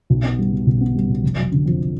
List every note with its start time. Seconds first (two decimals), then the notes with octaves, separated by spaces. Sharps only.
0.10 B1
0.24 B3
0.39 G3
0.52 B2
0.67 B1
0.81 B3
0.95 G3
1.09 B2
1.23 F1
1.37 F#3
1.52 D3
1.66 F2